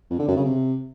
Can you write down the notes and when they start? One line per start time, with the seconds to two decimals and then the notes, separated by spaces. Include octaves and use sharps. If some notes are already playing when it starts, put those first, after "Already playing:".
0.10 F2
0.19 D3
0.28 F#2
0.36 C#3
0.45 C3